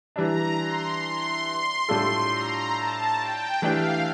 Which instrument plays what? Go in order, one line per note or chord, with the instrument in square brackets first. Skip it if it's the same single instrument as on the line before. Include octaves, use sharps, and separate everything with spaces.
[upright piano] E3 G3 D4 [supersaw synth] A#5
[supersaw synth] C6
C6
C6
[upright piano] A2 G3 D4 F4 A4 [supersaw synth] C6
[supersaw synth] A#5
A5
G5
[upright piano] E3 A3 D4 G4 [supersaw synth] F5